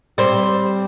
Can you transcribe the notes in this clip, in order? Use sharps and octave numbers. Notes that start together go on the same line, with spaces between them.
G3 C4